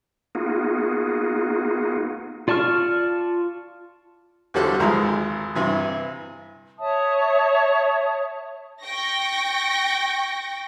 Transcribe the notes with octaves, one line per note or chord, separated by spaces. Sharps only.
A#3 B3 D#4 F4 F#4 G#4
F4 D5 A5 C#6 F6
E2 D3 G3 F#4 A4 C5
G#1 D#2 F3 G#3 A#5
G2 C3 E3
C#5 E5 A5 D#6
G5 C#6 A#6